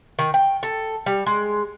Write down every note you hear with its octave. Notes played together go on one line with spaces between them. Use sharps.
D#3
G5
A4
G3
G#3